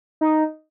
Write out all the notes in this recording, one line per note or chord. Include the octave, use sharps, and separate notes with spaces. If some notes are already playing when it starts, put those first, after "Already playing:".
D#4